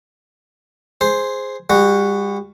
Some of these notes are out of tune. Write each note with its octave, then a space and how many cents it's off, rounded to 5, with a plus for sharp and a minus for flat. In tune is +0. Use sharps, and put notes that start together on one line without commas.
G#4 +0 C5 +0
G3 +35 F#4 +0